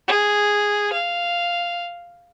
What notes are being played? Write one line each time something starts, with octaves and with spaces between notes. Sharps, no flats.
G#4
F5